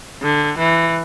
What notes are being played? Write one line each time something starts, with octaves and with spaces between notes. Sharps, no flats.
D3
E3